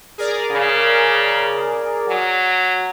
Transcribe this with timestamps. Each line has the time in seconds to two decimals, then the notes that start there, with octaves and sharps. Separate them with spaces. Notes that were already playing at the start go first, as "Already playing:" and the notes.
0.18 G#4 A#4 D5
0.52 C#3
2.08 F#3